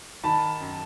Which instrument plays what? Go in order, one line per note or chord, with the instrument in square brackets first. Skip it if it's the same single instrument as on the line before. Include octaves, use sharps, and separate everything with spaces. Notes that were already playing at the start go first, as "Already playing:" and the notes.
[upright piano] D#3 A5 B5
F#2